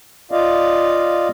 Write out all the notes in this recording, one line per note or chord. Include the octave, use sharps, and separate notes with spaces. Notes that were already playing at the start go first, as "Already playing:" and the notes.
F4 D5 D#5 F5